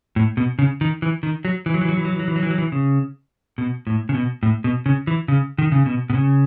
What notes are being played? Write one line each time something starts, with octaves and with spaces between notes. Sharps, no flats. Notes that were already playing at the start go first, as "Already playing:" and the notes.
A2
B2
C#3
D#3
E3
D#3
F#3
E3
F#3
E3
F#3
E3
F#3
E3
F#3
E3
F#3
E3
F#3
E3
C#3
B2
A2
C#3
B2
A2
B2
C#3
E3
C#3
D#3
C#3
B2
B2
C#3